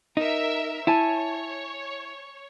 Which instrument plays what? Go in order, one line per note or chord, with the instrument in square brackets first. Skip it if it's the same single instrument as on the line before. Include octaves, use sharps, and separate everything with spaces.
[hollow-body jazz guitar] D#4 [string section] A#4 E5
[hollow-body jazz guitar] E4 [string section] C#5 [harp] G#5 A5